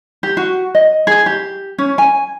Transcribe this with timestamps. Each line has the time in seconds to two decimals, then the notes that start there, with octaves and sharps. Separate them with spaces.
0.23 G4
0.37 F#4
0.75 D#5
1.07 G#4
1.26 G4
1.78 C#4
1.98 G#5